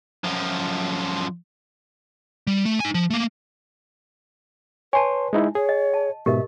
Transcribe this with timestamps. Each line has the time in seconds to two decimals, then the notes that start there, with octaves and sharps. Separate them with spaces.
0.24 F#2 F3
2.47 G3
2.65 A3
2.80 D#4 G#5
2.94 F3
3.10 A3 A#3
4.93 B4 C#5 G#5 A5 C6
5.33 G#3 D#4 E4
5.55 G#4 C#5
5.69 D#5
5.94 A5
6.26 G#2 B2 G4 A#4 D#5 E5